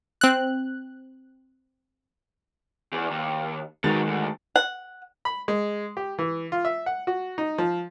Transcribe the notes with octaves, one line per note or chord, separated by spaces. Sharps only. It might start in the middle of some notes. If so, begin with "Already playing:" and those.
C4 F#6
E2
D#2
D#3 F#3 G#3 D#4 A6
D2
F#5
B5
G#3
G4
E3
F4
E5
F#5
F#4
D#4
F3